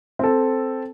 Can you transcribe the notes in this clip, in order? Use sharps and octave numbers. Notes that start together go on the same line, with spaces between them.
C4 A4